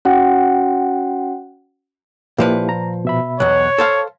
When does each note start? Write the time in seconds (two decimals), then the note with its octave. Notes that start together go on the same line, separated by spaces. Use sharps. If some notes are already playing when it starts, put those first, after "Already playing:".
0.05 C#4 F#4 F#5 G5
2.38 A#2 F3 A#3 E4 G4 B4
2.69 A#5
3.05 B2 E5 B5
3.40 B1 E2 C#5 F#6
3.78 A4 C5 F5 A5